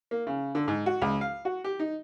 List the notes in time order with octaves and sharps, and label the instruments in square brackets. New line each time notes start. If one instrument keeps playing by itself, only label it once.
[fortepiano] A#3
C#3
D3
G#2
F#4
C#2
F5
F#4
G4
D#4